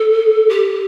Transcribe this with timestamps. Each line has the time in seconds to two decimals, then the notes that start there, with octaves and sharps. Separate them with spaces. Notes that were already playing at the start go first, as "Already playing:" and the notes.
Already playing: A4
0.49 G4